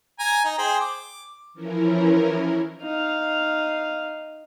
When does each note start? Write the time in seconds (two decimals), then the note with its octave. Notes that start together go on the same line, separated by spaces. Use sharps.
0.19 G#5 A#5
0.45 D#4
0.58 G#4 C5 G5
0.81 D6
1.53 E3 F3 C#4 E4 A#4
2.82 D#4 F5